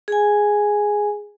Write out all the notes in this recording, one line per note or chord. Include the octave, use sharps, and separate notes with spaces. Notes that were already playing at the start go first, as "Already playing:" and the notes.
G#4 G#5